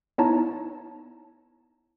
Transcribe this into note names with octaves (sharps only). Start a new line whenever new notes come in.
B3 D#4 E4 C#5 A5 A#5